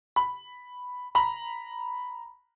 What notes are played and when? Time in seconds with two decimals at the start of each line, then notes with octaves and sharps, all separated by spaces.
0.16 B5
1.15 A#5 B5